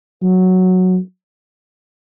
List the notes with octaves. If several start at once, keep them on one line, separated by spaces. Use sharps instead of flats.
F#3